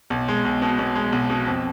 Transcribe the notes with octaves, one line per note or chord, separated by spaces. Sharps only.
B1
G#3
B1
B2
B1
G#3
B1
B2
F2